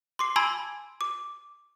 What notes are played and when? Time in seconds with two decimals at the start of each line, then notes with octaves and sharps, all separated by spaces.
0.19 C6 D6 C7
0.36 G#5 A5 B5 C6 E6 G#6
1.01 D6